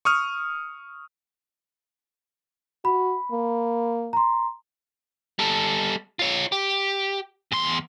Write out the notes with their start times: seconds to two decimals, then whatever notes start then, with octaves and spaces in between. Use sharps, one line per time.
0.05 C#6 D#6 F6
2.85 F#4 B5
3.32 A#3
4.13 A#5 C6
5.39 G3 A4
6.19 F4 C#5
6.52 G4
7.52 E2 C6